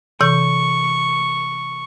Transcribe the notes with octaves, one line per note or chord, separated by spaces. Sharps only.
C3 E3 C#6 G6